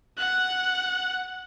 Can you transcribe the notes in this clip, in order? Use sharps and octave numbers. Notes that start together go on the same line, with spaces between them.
F#5 F#6